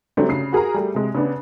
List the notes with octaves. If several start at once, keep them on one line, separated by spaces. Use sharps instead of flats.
D3 F#3 G3 A3 C4 D4
C#3 C7
F#4 G#4 A#4 A#5
G3 A3
C3 G#3
C#3 B3 D4